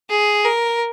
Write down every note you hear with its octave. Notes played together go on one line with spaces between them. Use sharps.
G#4
A#4